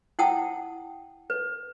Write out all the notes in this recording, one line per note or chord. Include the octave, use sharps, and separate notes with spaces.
E4 F#5 G5 A5 D#6
B4